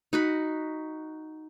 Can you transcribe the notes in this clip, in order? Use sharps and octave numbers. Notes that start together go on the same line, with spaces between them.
D#4 F#4 B5